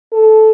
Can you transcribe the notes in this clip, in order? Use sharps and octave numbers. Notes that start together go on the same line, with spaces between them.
A4